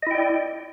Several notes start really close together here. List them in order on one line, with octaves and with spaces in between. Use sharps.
D#5 E4 G5 D5